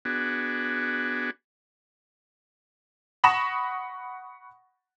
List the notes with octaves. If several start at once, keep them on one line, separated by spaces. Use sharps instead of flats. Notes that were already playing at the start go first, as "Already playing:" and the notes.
B3 D4 F#4 G#4
F#5 B5 C#6 D#6 A#6 E7